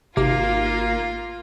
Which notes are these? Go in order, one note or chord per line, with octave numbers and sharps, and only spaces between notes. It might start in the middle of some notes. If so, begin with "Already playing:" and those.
G#1 C3 A#3 F4 D6